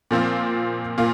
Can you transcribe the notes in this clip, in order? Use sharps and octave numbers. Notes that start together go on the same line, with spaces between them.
A#2 F3 C4 F4
A#2 F4